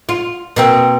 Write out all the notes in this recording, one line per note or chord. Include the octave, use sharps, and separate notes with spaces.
F4
B2 A#3 C4